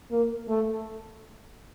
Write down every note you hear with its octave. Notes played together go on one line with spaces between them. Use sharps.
A#3
A3